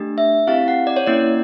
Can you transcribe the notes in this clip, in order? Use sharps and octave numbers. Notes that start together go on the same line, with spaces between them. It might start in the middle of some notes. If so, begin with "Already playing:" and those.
Already playing: A3 D4 G4
E5
C4 E4 G4 F5
F#5
D5
C#5
A#3 C#4 E4 D5